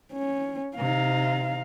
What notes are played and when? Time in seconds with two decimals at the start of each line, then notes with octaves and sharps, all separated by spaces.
0.13 C#4
0.77 C3 D#4 F5